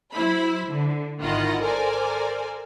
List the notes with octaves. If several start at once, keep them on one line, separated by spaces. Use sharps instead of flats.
F#3 E4 C5 B5
D3
G#1 D#3 E4 F4 D#5 F#5
A4 A#4 C5 D5 G#5